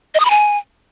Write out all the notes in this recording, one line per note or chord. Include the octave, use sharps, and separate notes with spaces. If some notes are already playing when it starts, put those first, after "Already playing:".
D#5
D#6
B5
G#5